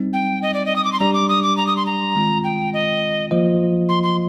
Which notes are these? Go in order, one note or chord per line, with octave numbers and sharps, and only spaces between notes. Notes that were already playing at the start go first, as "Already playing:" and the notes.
Already playing: G3 C4 D#4
G5
D#5
D5
D#5
D#6
D6
C6
G3 D4 G4 D5 A#5
D6
D#6
D6
A#5
D#6
C6
A#5
D#3 G#3 C4 F4
G5
D#5
F3 A#3 F4 C5 D#5
C6
C6